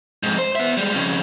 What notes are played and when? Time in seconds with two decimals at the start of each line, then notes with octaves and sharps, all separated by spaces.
0.23 F2 G#2
0.38 C5
0.55 B3 E5
0.78 G3 G#3
0.94 F2 C#3